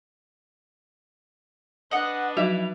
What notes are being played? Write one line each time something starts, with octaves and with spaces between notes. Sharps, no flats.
D4 B4 D#5 F#5
F3 F#3 E4 F#4 F7